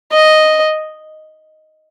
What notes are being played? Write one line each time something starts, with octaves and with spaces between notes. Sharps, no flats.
D#5